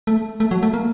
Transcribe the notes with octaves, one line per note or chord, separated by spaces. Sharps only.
A3
A3
F#3
A3
A#3